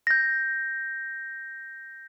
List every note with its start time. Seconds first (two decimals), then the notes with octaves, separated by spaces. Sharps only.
0.07 G6 A#6